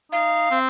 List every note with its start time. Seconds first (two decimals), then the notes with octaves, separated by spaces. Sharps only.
0.12 D#4 F5
0.51 C4